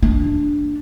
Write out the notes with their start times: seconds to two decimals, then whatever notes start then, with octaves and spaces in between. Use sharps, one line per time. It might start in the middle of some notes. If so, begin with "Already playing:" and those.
0.03 D4